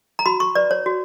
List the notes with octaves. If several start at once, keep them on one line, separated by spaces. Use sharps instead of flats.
A#5
F#4 B5
C#6
B4 D5
C#5
F#4